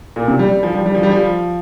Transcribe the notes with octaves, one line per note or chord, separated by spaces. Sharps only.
A#2
C3
G3
F3
G3
G3
F3
G3
F3